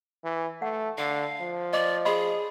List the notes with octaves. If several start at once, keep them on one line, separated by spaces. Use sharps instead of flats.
E3
A3 F#5
D3 F5
F3
D5 D#5 D6
G#4 D#5 B5 C6